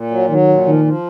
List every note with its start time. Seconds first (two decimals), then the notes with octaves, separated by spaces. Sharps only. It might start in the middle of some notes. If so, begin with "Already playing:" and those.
Already playing: A#2
0.11 F#3
0.30 D#3 F#3
0.48 A#2
0.66 D#3 F3
0.84 F3